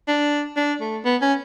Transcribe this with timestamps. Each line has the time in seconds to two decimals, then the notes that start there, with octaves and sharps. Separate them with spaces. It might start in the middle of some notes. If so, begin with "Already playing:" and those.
0.08 D4
0.57 D4
0.81 A3
1.05 B3
1.22 C#4